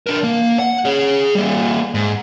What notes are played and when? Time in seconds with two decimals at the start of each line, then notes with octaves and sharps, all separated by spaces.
0.07 D4 A#4
0.23 A#3
0.59 F#5
0.85 G#4 C#5
1.35 G3 A#3
1.94 G#2